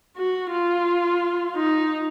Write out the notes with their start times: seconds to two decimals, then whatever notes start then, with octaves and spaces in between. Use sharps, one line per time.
0.17 F#4
0.51 F4
1.56 D#4